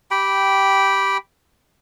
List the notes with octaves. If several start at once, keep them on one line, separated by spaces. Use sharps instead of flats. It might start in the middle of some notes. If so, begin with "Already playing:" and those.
G4 G5 B5